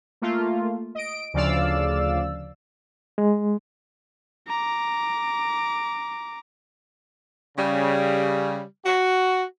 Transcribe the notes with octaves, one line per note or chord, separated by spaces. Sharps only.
A3 A#3 F4
D#5 D7
D2 C#3 F3 D5 F5 E6
G#3
A#5 D6
C#3 G3
F#4